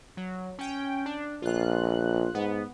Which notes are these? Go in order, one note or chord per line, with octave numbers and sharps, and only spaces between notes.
F#3
C#4 G5
D4
A#1 F4 F#6
G#2 B3